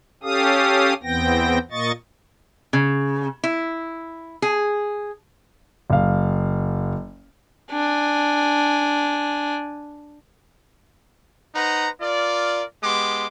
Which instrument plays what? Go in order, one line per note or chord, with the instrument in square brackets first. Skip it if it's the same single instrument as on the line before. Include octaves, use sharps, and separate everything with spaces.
[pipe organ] C#4 G4 A4 F5 D#6
E2 E3 B3 C4 G5 A#6
A#2 A#3 D#5 C#6 A6
[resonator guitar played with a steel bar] C#3
E4
G#4
[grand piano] F#1 F5
[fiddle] D4 G#5
[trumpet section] D#4 B4 C5 F#5 A#5
F4 A#4 D5
G#3 B3 G4 C6 D6